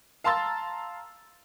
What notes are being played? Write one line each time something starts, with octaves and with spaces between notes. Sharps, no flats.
F5 A5 A#5 C6 E6 A6